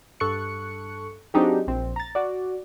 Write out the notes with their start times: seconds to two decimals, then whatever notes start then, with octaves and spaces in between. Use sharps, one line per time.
0.20 G2 A4 C#6 F#6 C#7
1.34 F#3 C4 D4 D#4 G4 G#4
1.67 A#1 C4
1.96 A#5 A6
2.15 F#4 D5